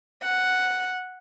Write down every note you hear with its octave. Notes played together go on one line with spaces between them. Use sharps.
F#5